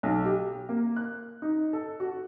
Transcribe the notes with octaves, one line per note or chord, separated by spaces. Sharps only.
B1
G4
A#3
F#6
D#4
A4
F#4